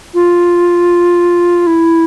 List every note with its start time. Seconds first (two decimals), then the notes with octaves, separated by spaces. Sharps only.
0.14 F4
1.67 E4